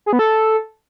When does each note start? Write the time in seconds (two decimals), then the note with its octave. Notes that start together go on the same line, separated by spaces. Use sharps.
0.06 G#4
0.13 B3
0.19 A4